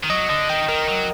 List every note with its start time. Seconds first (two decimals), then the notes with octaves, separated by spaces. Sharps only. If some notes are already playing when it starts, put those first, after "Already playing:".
0.04 D#3
0.10 F#3 D#5
0.29 D3 D#5
0.49 D#3 G5
0.68 D#3 A#4
0.89 F#3